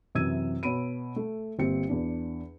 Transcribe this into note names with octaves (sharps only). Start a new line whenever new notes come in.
F#2 C3 E3 E6 G#6 D#7
B2 C#5 B5 D7 D#7
A3
G1 A#3 C4 G4 C#7
E2 D4